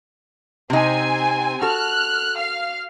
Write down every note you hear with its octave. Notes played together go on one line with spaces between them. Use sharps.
C3 C4 D#4 G#5
F#4 A4 F6 F#6
F5 F6